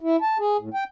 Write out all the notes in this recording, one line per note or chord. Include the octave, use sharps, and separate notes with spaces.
E4
A5
G#4
A2
G5